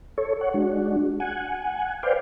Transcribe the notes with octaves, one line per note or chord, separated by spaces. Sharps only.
A4 C#5
C#5 F#5
G#3 D4 F#4
F#5 G#5
B4 C5 D5 F5 G5